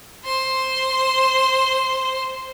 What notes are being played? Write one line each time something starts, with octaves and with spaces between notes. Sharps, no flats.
C5 C6